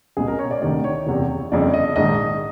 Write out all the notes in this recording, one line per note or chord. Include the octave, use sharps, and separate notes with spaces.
C#2 B2 G#4
A#4
C#5
D5
D2 C3 D#3 D5
C#5
F#1 E2 C3
G1 F2 C#3 D5
D#5
A#1 G#2 D#3 D#5